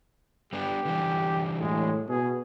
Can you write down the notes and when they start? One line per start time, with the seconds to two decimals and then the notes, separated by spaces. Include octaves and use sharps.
0.53 G3 B3 D4 G4
0.85 D3 E3 G3
1.61 A2 G#3
2.09 B2 G#4